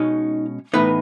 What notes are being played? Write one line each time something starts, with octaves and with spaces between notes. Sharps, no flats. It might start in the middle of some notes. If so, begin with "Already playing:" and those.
Already playing: B2 G#3 C#4 D#4
A2 E3 B3 D#4 B4